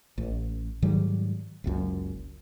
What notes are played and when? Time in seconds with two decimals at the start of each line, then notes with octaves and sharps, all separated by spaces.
0.18 A1
0.82 G#2 D#3 F#3 G3
1.64 F#1 C#2 F#2